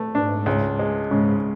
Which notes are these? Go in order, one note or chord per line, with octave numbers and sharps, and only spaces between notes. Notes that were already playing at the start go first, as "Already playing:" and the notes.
Already playing: A3
G#2 D4
C#2
G#3
G#2 C#3